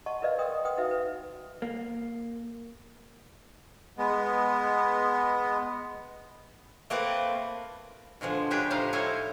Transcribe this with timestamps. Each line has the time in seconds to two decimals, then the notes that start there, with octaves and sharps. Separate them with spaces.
0.06 D#5 F#5 A5 C6 C#6
0.22 E4 A#4 B4 D5 D#5 F5
0.38 A#4 G5 C6 D#6
0.64 B4 F#5 G5 C6 D#6
0.77 D#4 E4 F#4 B4 E5 F5
0.91 B4
1.62 A#3
3.98 G#3 B3
6.90 A3 A#3 C4 B4
8.21 B2 D3 F3 G#3
8.51 C#3 D4 G4 G#4 B4 G5
8.70 A2 F3 D#4 D#5 F5
8.93 E4 A4 C5 C#5 D#5